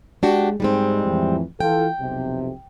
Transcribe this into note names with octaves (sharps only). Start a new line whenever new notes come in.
G#3 D4 F#4 G4
G#2 G3 G#3 C4 D#4
F2 A2 E3
E3 F4 A4 G5
B1 F2 C3